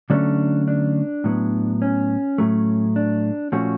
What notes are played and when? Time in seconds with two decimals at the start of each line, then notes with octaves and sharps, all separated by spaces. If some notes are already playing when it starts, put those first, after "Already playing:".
0.10 D3 F#3 A3 C#4 D4
0.68 D4
1.24 A2 F#3 B3
1.82 C#4
2.38 A2 F#3 A3
2.96 D4
3.52 A#2 F3 A3 C#4 F#4